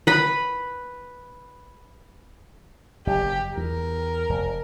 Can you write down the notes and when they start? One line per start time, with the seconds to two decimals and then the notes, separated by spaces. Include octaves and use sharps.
0.07 B4 B5
3.07 F#1 G4
3.57 E2 A#4
4.29 F1